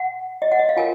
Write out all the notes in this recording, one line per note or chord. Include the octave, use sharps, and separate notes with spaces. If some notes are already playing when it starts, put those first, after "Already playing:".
Already playing: F#5
D#5
F#5
D#5
F5
F4 A#4 G#5